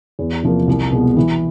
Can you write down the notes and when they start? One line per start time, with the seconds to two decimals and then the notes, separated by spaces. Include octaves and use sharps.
0.19 E2
0.43 C3 F3 A#3
0.67 C2
0.92 B2 G#3 B3
1.17 E3